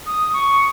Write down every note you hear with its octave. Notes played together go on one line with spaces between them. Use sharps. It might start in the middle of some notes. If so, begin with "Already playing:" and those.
D#6
C#6